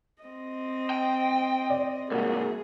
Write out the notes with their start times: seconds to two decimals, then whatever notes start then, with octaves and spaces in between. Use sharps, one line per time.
0.23 C4 D#5
0.90 G5
1.70 D5
2.11 C2 G#2 A#3 F#4 G#4